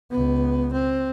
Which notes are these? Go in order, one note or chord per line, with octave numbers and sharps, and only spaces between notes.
C#2 B3
C4